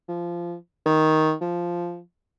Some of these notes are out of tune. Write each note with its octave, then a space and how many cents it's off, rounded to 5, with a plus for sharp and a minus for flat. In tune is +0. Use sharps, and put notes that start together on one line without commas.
F3 -15
D#3 +10
F3 -5